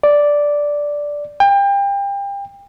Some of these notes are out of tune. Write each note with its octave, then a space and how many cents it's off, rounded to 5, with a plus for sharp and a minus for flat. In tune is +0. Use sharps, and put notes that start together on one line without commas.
D5 -5
G5 +30